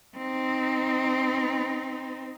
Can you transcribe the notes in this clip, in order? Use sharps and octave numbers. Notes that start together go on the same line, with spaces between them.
C4 D#4